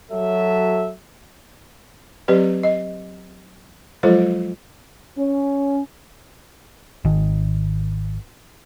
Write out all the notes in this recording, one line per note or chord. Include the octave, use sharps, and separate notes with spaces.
F#3 A4 E5
F#3 C4 G4 B4 D5
D#5
F3 F#3 G#3 F4 A4 C5
C#4
G#1 D#3